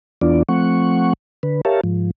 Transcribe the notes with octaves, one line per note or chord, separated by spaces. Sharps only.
E2 E3 B3 D4 F4 D5
F3 A3 C4 F#5 C#6
D3 B4
G4 A#4 C#5 E5 F5 A5
G#2 F3